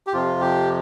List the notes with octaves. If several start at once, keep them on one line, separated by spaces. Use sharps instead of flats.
G4
F2 C3 F3 F4
G4